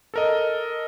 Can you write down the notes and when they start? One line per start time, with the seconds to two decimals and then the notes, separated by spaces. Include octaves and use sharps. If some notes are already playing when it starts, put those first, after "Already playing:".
0.14 A4 A#4 D#5